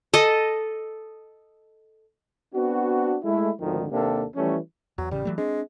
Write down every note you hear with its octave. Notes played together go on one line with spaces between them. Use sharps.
A4 D#5
B3 C4 D4 F#4
G#3 A3 E4
G#1 D2 D3 D#3 F3
D#2 C3 A#3 D4 G4 A4
E3 F3 G3 A3 C#4
E2 F#3
A1 C#3 G3
E3 F#3 A3
G#3 C4 D4